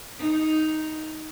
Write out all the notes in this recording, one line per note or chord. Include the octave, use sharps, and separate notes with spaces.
D#4